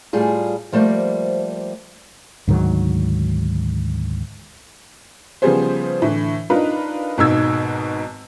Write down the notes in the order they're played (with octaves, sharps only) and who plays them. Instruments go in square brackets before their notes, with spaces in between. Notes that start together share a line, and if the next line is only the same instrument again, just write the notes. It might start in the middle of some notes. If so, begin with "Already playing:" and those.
[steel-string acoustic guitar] A2 G3 F4 G#4
F3 G3 A3 A#3 C5
[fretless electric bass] D2 G#2 D#3 F#3
[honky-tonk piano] C#3 F3 G3 B3 G#4 C5
A2 D3 E3
D4 D#4 F4 A#4 B4
G#1 G#2 B2 D#4 E6 G#6